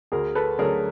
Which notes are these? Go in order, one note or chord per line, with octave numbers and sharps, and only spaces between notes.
D2 G#4 A#4
A4 B4
D3 F#3 A3 G#4 A#4